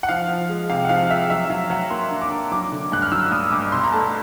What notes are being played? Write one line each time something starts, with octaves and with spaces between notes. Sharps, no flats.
F#5
F3 F5
F3
G#3
C3 F5
F#5
F3 F5
G#3 E5
F#3 E5
F#3 F5
F#3 F#5
A#3 C6
D4
D6
D4
F#3 D6
D3
G2 F#6
F6
F#3 E6
G2 D#6
G2 D6
B2 C6
A#5
A3 A5